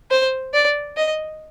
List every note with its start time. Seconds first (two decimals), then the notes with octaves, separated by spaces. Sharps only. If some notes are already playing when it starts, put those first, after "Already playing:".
0.11 C5
0.54 D5
0.97 D#5